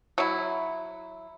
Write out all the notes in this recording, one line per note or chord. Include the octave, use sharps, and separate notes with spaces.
F#3 E4